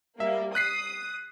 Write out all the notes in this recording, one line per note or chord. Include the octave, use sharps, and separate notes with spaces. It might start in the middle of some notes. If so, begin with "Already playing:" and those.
G3 A#3 E5
D#6 F#6 B6 C7